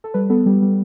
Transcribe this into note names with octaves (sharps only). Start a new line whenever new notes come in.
A4
G3 B4
B3 A4
G3
G3